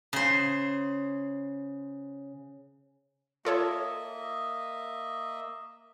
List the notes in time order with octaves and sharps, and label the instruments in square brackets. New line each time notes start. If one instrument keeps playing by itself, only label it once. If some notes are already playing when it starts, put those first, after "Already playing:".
[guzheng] C#3 C5
[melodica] A#3 D#5 E5 [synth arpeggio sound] F4 A4 C#5